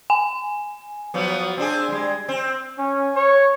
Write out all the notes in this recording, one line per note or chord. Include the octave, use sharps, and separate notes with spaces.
G#5
F3 F#3 B3
C4 D4 G#4
G3 G#3
C4
C#4
C#5